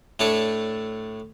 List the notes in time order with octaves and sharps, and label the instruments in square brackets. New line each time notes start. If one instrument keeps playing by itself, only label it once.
[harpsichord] A2 A3 D4 C#5